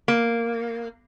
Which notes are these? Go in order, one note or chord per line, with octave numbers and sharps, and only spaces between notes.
A#3